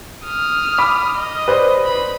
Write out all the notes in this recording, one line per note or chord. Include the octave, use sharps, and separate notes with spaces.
D#6 F6
B5 D6 B6
D#5
B4 C5 D5
B5